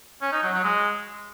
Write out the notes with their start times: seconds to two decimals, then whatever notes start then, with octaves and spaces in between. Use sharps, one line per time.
0.22 C#4
0.32 D#4
0.43 F#3
0.53 F#3
0.64 G#3